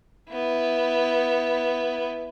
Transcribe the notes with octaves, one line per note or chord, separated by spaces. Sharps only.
B3 E4